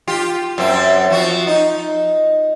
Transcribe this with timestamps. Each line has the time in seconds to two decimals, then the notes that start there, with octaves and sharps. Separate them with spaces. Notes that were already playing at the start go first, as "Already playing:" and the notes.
0.08 F4 G4
0.58 F#2 C4
1.10 F3 F#4
1.47 D#4